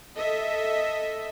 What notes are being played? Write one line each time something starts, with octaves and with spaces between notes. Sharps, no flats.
A4 D#5 E5